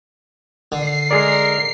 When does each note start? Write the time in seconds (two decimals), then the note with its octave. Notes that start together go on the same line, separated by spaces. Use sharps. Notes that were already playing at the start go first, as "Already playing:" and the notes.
0.72 D3 C7
1.11 G#3 G#4 A#4 D5